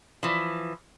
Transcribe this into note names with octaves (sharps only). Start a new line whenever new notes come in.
E3 F3